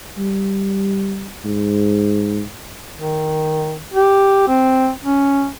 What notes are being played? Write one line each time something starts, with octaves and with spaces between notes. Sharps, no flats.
G3
G#2
D#3
G4
C4
C#4